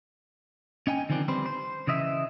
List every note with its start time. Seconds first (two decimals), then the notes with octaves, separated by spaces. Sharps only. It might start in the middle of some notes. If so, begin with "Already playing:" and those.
0.87 C#4 D#5 G5 G#5
1.09 D3 D#3 F3 C4 D4
1.28 G3 C4 B4 C5
1.46 C5
1.87 C#3 E3 D#5 E5